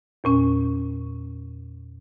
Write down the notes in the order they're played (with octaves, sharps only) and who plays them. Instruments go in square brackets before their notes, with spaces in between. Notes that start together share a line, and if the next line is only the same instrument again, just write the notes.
[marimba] E2 A#2 C#4